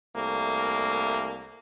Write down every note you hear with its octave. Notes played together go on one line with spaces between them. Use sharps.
C2 A3 A#3